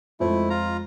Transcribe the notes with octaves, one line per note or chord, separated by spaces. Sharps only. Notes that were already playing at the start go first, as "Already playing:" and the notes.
F2 G#3 A3 E4 C5
F4 A#5